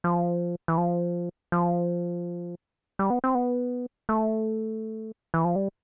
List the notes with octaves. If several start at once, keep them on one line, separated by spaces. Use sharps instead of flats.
F3
E3
F3
F3
G3
B3
C4
B3
A3
E3
F3
G3